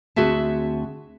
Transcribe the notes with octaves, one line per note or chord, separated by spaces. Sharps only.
D2 C4 F#4 G#4 E5 A5